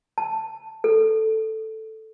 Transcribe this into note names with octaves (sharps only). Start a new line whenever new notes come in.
A5
A4